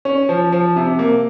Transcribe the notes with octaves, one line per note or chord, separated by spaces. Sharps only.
C#4
F3
F3
C3
A#3